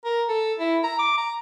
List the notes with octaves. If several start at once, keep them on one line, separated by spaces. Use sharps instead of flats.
A#4
A4
E4
A#5
D6
A#5